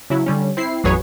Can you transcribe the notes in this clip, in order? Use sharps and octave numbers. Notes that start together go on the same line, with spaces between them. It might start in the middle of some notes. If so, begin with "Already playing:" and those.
C#3 F#3 E4
D3 G3 C#4
C4 E4 C7
A1 F2 F#3 G#4 B4 C#5